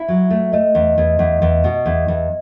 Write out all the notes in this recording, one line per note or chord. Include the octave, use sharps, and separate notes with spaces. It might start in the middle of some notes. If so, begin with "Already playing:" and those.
Already playing: E4 E5
F#3
A3
A3 D#5
E2
E2
E2
E2
B2
E2
E2